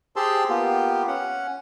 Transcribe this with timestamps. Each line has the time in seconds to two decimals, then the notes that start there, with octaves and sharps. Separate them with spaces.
0.16 G4 G#4 C5 A5 C6 E6
0.49 A#3 B3 F4 G4
1.08 C#4 F#5